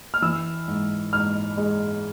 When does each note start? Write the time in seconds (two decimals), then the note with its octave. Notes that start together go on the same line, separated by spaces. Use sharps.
0.14 F6
0.22 E3 E6
0.68 G#2
1.13 G#2 F6
1.57 G#3